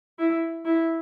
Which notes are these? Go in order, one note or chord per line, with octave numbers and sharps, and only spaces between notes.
E4
E4